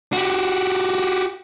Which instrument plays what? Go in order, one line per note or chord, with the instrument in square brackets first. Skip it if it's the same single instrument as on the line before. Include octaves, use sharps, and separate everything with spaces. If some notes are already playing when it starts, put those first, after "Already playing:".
[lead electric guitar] F#4 G4